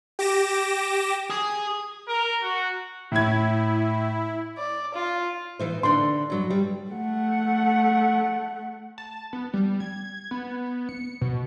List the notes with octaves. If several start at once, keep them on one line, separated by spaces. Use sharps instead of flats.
G4 D6 A#6 E7
G#4
A#4
F#4
A2 E4 G#6
D5
F4
E3 D#4 C5
D3 D4 C6
G2 F#3
G3
A3 F#5
A5
B3
G3
G#6
B3
C#7
B2